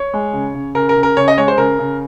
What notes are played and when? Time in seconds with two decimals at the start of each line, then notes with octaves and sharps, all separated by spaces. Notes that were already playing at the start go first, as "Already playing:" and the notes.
Already playing: C#5
0.14 G#3
0.33 C#3
0.55 C#3
0.75 C#3 A#4
0.89 A#4
0.97 C#3
1.03 A#4
1.17 C#3 C#5
1.28 D#5
1.38 G#3 C#5
1.48 C5
1.58 C#3 A#4
1.79 C#3